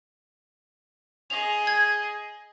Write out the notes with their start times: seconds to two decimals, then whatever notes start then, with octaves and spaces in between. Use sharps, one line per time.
1.30 G#4 D#5 F7
1.67 G#6